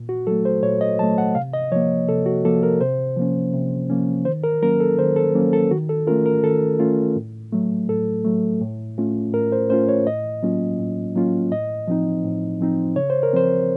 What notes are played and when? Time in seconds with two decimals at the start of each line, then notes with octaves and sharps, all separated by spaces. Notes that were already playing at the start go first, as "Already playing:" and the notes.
Already playing: A#2
0.09 F#4
0.27 F#3 A3 A4
0.45 C5
0.63 A#2 C#5
0.81 D#5
0.99 F#3 A3 A5
1.18 F#5
1.35 C3 F5
1.53 D#5
1.72 F3 C#5
1.76 A#3
2.08 C3 A4
2.26 F#4
2.45 F3 A#3 A4
2.63 A#4
2.81 C3 C5
3.17 F3 A#3 C#4
3.54 C3
3.90 F3 A#3 C#4
4.25 D#3 C5
4.44 A#4
4.62 F#3 A#3 C#4 A#4
4.80 A4
4.99 D#3 C5
5.16 A4
5.35 F#3 A#3 C#4
5.53 A4
5.71 D#3 F#4
5.89 A4
6.07 A3 C#4 F4 A#4
6.26 A#4
6.44 D#3 A4
6.79 A3 C#4 F4
7.16 A2
7.52 F#3 A3
7.89 A2 A4
8.25 F#3 A3
8.61 A2
8.98 A3 C#4 F4
9.33 A2 A#4
9.52 C5
9.70 A3 C#4 F4 C5
9.89 C#5
10.07 A2 D#5
10.43 F#3 A#3 C#4 F4
10.79 A2
11.16 F#3 A#3 C#4 F4
11.52 A2 D#5
11.88 F3 C4 D#4
12.24 A2
12.61 F3 C4 D#4
12.96 C#3 C#5
13.10 C5
13.23 A#4
13.33 F3 C4 C5